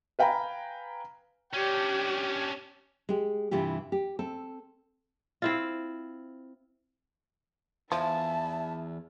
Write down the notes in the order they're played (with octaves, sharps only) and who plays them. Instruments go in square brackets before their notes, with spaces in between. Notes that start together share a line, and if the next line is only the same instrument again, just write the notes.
[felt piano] B4 F5 G5 G#5 A#5 B5
[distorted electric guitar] C#4 D4 [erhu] G4
[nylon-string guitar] G#3 G4
G2 C3 E3 F4 G4
G4
C4 A4
[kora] C4 E4 F4
[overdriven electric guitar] E2 [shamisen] F3 [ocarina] E5 [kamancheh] A5